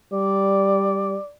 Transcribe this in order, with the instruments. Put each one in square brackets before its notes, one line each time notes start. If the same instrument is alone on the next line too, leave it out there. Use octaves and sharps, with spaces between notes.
[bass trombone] G3 [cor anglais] D5